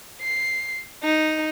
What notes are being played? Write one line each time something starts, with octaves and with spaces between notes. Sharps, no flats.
C7
D#4